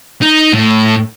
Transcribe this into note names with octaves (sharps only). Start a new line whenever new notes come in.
D#4
A2